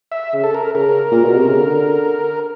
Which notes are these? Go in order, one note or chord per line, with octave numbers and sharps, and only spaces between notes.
E5
C#3
A4
A#4
C#3 A#4
A#2
B2
C3
C#3
D3